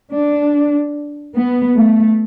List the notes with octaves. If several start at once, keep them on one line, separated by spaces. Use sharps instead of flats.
D4
B3
A3